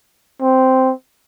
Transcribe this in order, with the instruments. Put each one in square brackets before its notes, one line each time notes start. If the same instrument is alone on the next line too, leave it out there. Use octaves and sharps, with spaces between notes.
[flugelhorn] C4